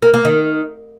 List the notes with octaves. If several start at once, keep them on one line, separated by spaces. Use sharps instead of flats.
A#3
A#3
D#3